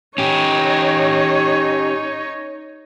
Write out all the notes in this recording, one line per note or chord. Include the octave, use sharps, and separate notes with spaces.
C#4 D#4 G4 C#5